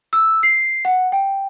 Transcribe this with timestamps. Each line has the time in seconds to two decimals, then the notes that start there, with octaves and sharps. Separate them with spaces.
0.13 E6
0.43 C7
0.85 F#5
1.12 G5